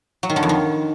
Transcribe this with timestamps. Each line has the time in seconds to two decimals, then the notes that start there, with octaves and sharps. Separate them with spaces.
0.23 F#3
0.30 D#3
0.36 D3
0.43 F2
0.49 D#3